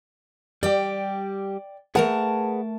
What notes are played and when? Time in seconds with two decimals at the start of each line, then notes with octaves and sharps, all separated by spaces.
0.63 G3 G4 D5 G5
1.95 A3 G#4 A#4 B4 F#5 A5